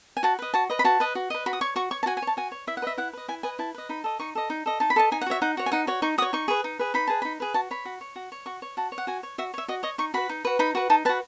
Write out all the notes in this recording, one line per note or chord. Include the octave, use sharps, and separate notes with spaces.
G#5
F#4 A5
B4 D#5
F#4 A5
B4 D#5
B5
F#4 A5
B4 D#5
F#4
B4 D#5
F#4 B5
D#6
C#5 C#6
F#4 C#6
C#5 C#6
A5
F#4 G#5
G#5
C#5 A5
F#4 G#5
C#5
E4 E5
F#5
B4 D#5 E5
E4 F#5
B4 D#5
E4 G#5
B4 D#5 G#5
E4 A5
B4 D#5
D#4 B5
A4 D#5
D#4 C#6
A4 D#5
D#4
A4 D#5
D#4 A5
B5
A4 D#5 A5
D#4 G#5
F#5
F#4 C#5 E5
D#4 F#5
F#4 C#5
G#5
D#4 F#5
F#4 C#5
D#4 C#6
F#4 C#5 D#6
D#4 C#6
G#4 B4
D#4
G#4 B4
D#4 B5
G#4 B4 A5
D#4 B5
G#4 B4
F#4 A5
C#5 B5
F#4
C#5
F#4
C#5
F#4 C#6
C#5
F#4 A5
C#5
F#5
F#4 G#5
C#5
F#4 E5
C#5 E5
F#4 D#5
C#5 D#5
D#4 C#6
F#4 B4 B5
D#4
F#4 B4
D#4 B5
F#4 B4
D#4 A5
F#4 B4 A5